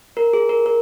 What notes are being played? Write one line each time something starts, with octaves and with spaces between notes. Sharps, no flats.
A#4
G#4
A#4
A#4